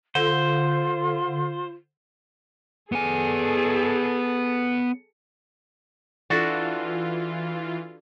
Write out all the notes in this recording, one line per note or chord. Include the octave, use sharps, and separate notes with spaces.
D3 F4 C5
B3 G#4 A4 G#5
E3 D4 F4 F#4 A4